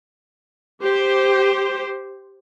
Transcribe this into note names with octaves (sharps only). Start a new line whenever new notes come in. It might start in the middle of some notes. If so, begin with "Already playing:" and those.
G4 C5